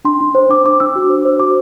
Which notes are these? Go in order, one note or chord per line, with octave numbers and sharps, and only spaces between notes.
D4 C6
D4
C5
D4 D6
D4 D6
D4 E6
F#4
C5
C5
F#4 D6